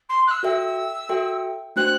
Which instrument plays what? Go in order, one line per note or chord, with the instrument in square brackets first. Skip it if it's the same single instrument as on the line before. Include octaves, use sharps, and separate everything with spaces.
[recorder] C6
F#6
E6
[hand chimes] F#4 A4 E5 G5
F#4 A4 E5 G5
[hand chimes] A3 D4 F#4 C5 G5 [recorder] F#6